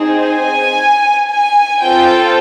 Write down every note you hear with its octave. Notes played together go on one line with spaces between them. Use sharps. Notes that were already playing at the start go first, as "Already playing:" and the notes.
Already playing: C4 D#4 G#4
G#5
G#5
C4 F4 A4 G5